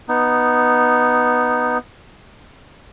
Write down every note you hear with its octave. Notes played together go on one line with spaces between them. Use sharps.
B3 D#4